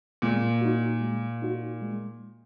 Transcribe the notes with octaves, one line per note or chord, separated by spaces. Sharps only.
A#2 G#3
D#4 F#4
G#3
D#4 F#4
G#3